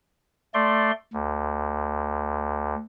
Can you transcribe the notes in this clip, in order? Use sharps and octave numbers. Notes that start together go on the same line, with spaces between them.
A3 D5 C6
D2